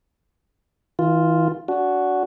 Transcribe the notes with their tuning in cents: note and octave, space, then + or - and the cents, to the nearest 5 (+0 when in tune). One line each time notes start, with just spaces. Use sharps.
E3 -40 F4 +0
D4 -30 F#4 +0